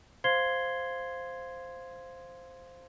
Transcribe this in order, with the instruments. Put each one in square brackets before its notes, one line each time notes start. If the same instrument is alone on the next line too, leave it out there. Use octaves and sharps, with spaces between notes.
[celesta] C5 F5 C6 G#6 C7 G7